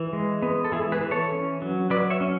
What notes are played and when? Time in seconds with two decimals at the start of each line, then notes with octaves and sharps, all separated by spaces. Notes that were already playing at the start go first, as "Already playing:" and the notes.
Already playing: E3
0.13 G#3
0.42 B3
0.64 A4
0.72 E3 E4 G#4
0.92 G#4 B4
1.01 E3
1.11 A4 C#5
1.32 C#4
1.62 F#3
1.90 F#3 B4 D5
2.10 C#5 E5
2.21 C#4